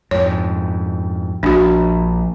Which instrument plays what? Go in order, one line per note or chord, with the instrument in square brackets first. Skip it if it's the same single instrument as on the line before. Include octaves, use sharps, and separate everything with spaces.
[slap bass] F2 G#2 [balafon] C#5
[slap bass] A#1 [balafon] D4 F#4